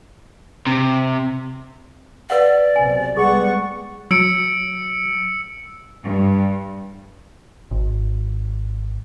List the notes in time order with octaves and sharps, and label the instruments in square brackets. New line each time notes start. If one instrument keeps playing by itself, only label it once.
[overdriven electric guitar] C3
[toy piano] B4 F5 F#5 [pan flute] D5
[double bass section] B1 C3 [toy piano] G#5
[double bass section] G3 G#3 B3 [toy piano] G#4 [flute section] F#5 C#6
[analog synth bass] F#3 [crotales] E6 C#7 D7
[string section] G2
[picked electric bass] G#1